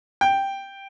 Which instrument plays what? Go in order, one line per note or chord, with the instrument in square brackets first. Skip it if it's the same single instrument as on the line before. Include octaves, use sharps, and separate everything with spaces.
[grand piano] G5